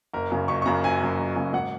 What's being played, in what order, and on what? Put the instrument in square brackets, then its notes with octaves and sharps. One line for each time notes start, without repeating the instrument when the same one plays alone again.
[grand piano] F#1 A#4
F#2 C#3
F#1 C#6
C#6
F#2 C#3 A#5
F#1 G#5
F#2 C#3
F#1
F#2 C#3
G#1 F#5